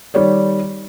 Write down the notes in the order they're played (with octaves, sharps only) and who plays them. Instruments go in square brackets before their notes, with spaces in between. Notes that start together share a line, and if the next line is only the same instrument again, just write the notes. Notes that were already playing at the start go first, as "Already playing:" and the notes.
[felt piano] D#3 G3 G4 C#5 D5